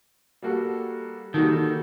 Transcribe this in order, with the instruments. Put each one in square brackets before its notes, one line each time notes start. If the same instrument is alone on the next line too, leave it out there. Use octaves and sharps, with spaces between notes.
[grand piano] G3 A#3 F#4 A4
[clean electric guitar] D#3 [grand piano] G3 A#3 F#4 A4